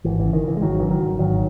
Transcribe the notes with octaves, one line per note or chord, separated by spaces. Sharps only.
G#1 E3
C#3 E3
D#3
C#3 E3
G#3
G#1 D#3 F#3
C#3 E3
D#3 F#3
G#1
G#1 D#3 F#3